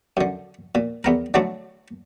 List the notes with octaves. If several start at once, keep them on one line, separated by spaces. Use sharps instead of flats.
F#2 D3
A#2
E2 B3 A#4
D3 E3 F#3 A3 D4